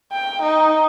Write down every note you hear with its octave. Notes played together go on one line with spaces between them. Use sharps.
G5
D#4